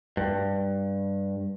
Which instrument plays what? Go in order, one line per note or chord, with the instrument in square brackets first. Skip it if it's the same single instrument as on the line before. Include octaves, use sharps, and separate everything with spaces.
[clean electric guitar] G2